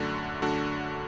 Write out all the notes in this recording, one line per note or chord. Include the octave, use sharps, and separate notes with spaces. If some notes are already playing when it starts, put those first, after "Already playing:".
Already playing: F#2 D3 A3 D4 F#4
F#2 D3 A3 D4 F#4